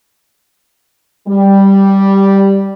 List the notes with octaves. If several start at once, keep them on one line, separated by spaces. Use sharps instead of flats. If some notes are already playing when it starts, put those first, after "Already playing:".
G3